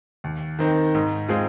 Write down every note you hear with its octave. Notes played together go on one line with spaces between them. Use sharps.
D#2
D#3 C4 D#4
G#2
G#3 C4 F4 G#4